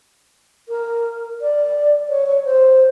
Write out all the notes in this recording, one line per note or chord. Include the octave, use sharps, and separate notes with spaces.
A#4
D5
C#5
C#5
C5